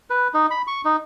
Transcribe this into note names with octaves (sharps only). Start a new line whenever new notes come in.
B4
D#4
B5
C#6
D#4